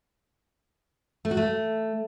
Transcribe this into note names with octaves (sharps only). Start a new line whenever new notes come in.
A3
F#4
A3